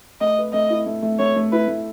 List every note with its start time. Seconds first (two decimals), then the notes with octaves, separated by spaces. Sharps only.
0.21 A3 D#5
0.38 B4
0.53 A3 D#5
0.70 E4
0.86 A3
1.02 A3
1.19 A3 C#5
1.36 A3
1.52 E4 B4
1.68 A3